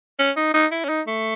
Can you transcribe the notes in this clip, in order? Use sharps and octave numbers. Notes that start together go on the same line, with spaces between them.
C#4
D#4
D#4
E4
C#4
D#4
A3